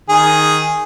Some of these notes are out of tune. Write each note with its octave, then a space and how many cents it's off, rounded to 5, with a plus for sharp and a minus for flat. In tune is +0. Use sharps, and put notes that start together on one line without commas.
D#3 +0 G#4 +0